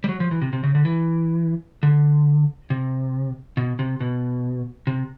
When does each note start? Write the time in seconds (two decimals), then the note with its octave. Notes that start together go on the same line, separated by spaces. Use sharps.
0.04 G3
0.09 F#3
0.20 F3
0.31 E3
0.41 C3
0.53 C3
0.63 C#3
0.75 D3
0.85 E3
1.83 D3
2.70 C3
3.57 B2
3.79 C3
4.00 B2
4.87 C3